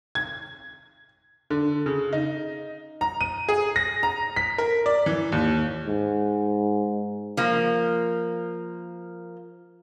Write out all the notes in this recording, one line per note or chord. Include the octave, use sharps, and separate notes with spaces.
G#6
D3
C#3
D#4
A#5
D#7
G#4
A#6
A#5
B6
A#4
D5
E3
D#2
G#2
F3 A#3